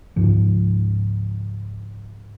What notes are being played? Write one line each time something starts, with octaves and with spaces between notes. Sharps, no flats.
C#2 G#2 F3